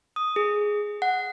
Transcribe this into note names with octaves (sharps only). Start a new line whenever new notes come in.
D#6
G#4
F#5